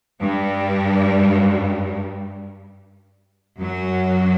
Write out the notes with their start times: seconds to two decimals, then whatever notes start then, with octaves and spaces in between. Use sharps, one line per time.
0.21 G2 G3
3.59 F#2 F#3